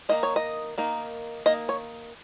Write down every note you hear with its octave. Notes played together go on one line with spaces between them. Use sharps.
D#3 A#3 D#4 D#5
C#5
D#5
D#3 A#3 D#4
D#3 A#3 D#5
C#5